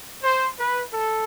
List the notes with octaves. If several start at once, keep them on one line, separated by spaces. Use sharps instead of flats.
C5
B4
A4